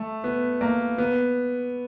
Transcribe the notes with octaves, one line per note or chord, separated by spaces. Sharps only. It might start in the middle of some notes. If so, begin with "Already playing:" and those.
Already playing: A3
B3
A#3
B3